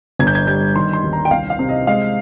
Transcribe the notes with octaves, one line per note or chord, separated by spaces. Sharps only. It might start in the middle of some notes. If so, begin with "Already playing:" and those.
G1 G#6
G6
G#6
G3 G6
D#3 C6
C6
D#2
A#5
G5
C2 F5
F5
C3
D#5
G#3 F5